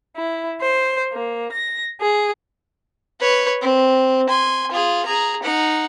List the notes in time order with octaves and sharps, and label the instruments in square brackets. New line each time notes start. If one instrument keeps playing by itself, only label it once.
[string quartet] E4
C5
A#3
A#6
G#4
[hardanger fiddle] B4 C#5
C4
G#5 C6
F4 G#4
G#4 A#5
D#4 F#5